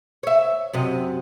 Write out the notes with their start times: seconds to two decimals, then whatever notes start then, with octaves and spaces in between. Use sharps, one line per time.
0.23 C#5 E5
0.73 F#2 C3 D#5